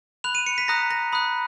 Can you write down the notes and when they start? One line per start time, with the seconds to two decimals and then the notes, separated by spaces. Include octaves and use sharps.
0.24 B5 F#6 F7
0.35 D#7
0.46 C#7
0.58 B6
0.68 A#5 D#6 F#6 A#6
0.91 A#6
1.12 B5 D#6 F#6